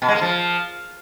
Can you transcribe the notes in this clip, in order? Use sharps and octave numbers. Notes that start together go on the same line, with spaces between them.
B2
G#3
A#3
F3